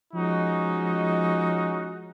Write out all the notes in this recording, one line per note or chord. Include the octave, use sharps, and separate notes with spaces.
F3 G#3 C#4 D#4 F#4